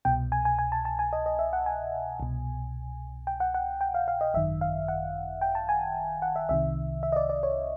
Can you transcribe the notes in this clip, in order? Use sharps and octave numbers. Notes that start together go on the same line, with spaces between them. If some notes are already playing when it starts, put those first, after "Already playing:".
C2 B2 G5
G#5
G#5
G#5
A5
A5
G#5
D#5
D#5
E5
F#5
G#5
C2 B2
G5
F#5
F#5
G5
F5
F5
D#5
G#1 F#2 D#3 E5
F5
F#5
G5
A5
G#5
F#5
E5
C2 C3 D#3 E5
E5
D#5
D5
D5
C#5